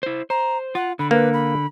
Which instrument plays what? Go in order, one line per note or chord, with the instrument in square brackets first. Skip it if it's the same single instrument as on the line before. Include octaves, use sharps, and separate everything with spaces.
[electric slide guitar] E4 C5
[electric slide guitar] C5 [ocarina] A#5
[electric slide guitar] F4 [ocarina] F#5
[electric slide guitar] D3 [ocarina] B5
[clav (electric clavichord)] A#3 [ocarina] B4
[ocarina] B5